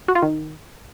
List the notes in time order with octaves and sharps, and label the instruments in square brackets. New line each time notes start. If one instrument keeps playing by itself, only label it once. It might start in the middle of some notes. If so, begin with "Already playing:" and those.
[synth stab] F#4
F4
D#3